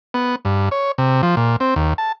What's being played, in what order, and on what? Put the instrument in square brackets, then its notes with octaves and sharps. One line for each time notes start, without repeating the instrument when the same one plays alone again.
[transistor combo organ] B3
G2
C#5
C3
F3
A#2
C4
D#2
A5